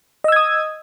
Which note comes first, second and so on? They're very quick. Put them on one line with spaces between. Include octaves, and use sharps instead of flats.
D#5 E6 G#6 D#6